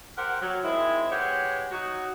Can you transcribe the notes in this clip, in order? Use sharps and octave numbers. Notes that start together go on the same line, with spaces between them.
G4 A#4 C5 F#5
F#3
D#3 G#3 C4 E4
G#3 G4 B4 C#5 F#5
F#3 D#4 F#4